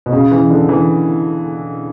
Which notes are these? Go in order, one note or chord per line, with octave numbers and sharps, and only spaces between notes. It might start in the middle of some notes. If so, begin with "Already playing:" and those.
B2
C#3
E3
D3
E3